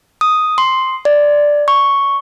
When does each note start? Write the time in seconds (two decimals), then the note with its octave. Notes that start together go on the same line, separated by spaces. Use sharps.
0.21 D#6
0.58 C6
1.05 D5
1.68 C#6